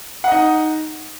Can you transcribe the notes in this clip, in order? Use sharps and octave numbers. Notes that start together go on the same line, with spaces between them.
D#4 D#5 F#5